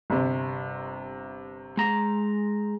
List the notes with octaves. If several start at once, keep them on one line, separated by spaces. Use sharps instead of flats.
G1 C3
G#3 A#5